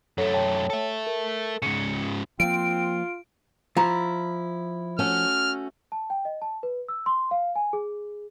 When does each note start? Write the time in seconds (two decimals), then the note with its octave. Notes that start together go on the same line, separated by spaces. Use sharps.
0.18 F#2 A3 A4 C#5 F#5
0.33 C#5 G5 A5
0.70 A4 E5
1.07 A#4
1.62 G#2 C#3 C#7
2.40 F3 A#3 C4 F4 D7
3.77 F3 E4 A#5
4.99 A3 C#4 F#4 F6
5.92 A5
6.10 G5
6.25 D#5
6.42 A5
6.63 B4
6.88 E6
7.06 C6
7.31 F5
7.56 G#5
7.73 G#4